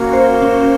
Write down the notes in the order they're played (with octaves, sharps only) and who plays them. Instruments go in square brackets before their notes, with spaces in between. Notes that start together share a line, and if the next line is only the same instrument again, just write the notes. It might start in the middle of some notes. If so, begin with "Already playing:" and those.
Already playing: [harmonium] A#3 [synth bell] C#4 F#4
[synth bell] C5
C#4